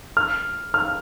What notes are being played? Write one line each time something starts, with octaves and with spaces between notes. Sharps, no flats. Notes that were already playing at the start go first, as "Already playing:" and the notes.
F6
F6